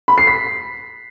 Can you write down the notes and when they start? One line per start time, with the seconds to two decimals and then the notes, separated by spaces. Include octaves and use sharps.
0.08 B5
0.18 C7
0.27 B6